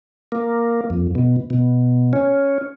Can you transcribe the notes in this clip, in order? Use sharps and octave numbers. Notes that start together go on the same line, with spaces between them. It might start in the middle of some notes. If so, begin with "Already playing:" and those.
A#3
F2
B2
B2
C#4